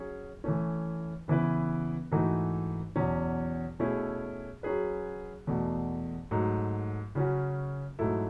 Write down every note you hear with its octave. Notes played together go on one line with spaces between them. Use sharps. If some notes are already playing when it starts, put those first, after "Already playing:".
Already playing: F#3 C#4 G#4
E3 A3 C#4
C#3 E3 B3 E4 B4
G#2 E3 A3 D#4 F#4
E2 B2 F#3 C#4
B2 A3 C#4 E4 G#4
F#3 C#4 G#4 B4
E2 B2 A3
G#2 F#3 A3
C#3 F#3 C#4 F#4
G#2 F#3 A3 E4 A4